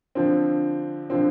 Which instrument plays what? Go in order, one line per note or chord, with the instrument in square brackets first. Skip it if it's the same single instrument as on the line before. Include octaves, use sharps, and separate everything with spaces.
[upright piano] D3 F3 C4
D3 F3 C4